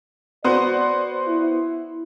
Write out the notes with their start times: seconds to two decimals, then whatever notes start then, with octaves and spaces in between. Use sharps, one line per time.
0.44 B3 F#4 C5 D5
1.27 E4